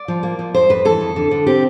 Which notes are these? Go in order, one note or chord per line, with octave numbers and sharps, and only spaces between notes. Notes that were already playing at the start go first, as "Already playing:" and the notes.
Already playing: D5
F3
A#3
F3
F2 C5
F2 B4
E3 A4
F2
D3
D3
C4 G4